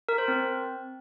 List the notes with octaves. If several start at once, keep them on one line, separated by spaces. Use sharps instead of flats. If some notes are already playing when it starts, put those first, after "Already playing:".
A#4
C5
C4